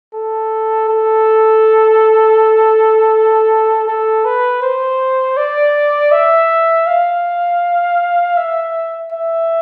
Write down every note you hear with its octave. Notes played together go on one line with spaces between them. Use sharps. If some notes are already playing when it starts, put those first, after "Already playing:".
A4
A4
A4
B4
C5
D5
E5
F5
E5
E5